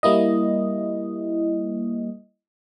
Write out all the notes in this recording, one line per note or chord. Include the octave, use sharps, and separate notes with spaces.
G3 A#3 E4 D#5